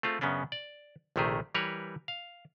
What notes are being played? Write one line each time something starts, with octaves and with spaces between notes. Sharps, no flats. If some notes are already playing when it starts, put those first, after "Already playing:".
A3 C4 F4 G#4
F#2 C#3 B3 C#4 D4
D5
A#1 C3 D#3 A3 G4 G#4
E3 G3 A#4 B4 C#5
F5